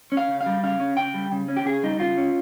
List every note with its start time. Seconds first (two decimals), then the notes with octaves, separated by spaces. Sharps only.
0.12 C#4
0.17 F5
0.28 C#3
0.41 F5
0.46 G3
0.63 C#3 F5
0.80 C#4
0.97 C#3 G5
1.14 G3
1.32 C#3
1.48 C#4
1.56 G4
1.65 C#3 G#4
1.83 G3 D#4
2.00 C#3 F4
2.17 C#4